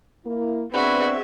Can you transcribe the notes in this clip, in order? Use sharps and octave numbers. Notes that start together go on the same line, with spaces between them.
A#3 E4
B3 C4 D4 F#4 G#4 B4 D5 E5